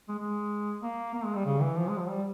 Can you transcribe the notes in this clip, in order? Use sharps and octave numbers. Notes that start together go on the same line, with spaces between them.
G#3
G#3
A#3
A#3
G#3
G3
C#3
E3
F3
G#3
F3
G3